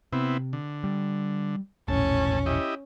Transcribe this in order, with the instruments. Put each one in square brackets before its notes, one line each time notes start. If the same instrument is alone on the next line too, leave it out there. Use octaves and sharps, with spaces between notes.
[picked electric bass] C3 [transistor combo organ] B3 C4 E4
[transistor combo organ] D3
[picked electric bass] G3
[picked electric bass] E1 A#1 [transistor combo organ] A2 A5 [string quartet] C#4
[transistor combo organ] E4 G4 D#5